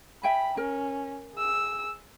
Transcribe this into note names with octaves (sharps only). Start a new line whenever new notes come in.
E5 G5 G#5 B5
C#4 A#4
G#4 E6